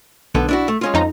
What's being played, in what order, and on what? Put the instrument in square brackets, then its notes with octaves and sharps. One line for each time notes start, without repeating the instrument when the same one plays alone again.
[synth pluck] B1 [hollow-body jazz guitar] D3 B3 A4
[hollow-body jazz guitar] D4 E4 F#4
A3
G#3 C#4 F4
[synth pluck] F2 D#4 A#5